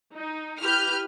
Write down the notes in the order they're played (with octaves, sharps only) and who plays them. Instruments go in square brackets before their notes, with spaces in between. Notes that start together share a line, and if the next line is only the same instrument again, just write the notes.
[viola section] D#4
[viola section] E4 G4 B4 [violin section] F6 G6